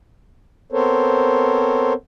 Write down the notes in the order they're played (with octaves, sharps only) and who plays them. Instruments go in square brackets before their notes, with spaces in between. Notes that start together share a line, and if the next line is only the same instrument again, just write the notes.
[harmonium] B3 C4 A4 A#4 C5 C#5